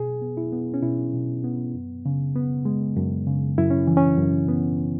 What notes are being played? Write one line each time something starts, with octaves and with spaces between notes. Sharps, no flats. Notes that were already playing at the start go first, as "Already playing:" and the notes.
Already playing: B2 G#4
B3
E4
B3
C#4
B2 E4
B2
B3
F#2
C#3
B3
G#3
F#2
C#3
F#2 E4
C#4
E3
C#4
F#2
B3